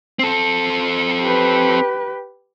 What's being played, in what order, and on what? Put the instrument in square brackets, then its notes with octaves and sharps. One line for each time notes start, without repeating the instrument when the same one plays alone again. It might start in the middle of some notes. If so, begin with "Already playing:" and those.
[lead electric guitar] C4 A4
[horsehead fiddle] G4 B4